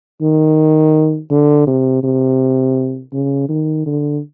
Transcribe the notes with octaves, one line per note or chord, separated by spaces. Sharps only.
D#3
D3
C3
C3
C#3
D#3
D3